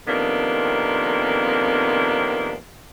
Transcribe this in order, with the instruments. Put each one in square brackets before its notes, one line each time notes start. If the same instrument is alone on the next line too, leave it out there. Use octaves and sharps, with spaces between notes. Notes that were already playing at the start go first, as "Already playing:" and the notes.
[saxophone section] F2 C3 D#3 A#3 B3 D4